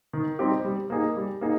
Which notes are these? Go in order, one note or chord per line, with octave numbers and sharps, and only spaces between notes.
D#3
G3 C4 D#4 G4
G3
A#3 D#4 G#4
G3
A#3 D#4 G#4